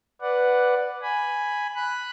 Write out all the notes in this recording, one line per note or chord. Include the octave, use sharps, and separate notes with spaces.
B4 D5 F#5
G#5 B5
B5 F#6